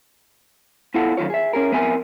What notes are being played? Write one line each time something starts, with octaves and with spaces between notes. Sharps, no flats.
B3 E4 F4 A4 F#5
F#2 D#3 F#3 F4 C#5
G#4 E5
C#4 G#4 A#4
F2 B3 A#4 E5 G#5